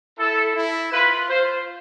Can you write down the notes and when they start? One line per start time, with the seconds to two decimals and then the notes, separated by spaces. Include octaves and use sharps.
0.18 E4 A4
0.56 E4
0.93 F4 B4
1.30 F4 C5